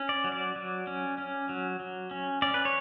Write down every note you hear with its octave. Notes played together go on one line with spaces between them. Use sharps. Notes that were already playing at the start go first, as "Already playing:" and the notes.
Already playing: C#4
D5
F#3
D5
F#3
C#4
C#4
F#3
F#3
C#4
C#4 D5
B4
C#5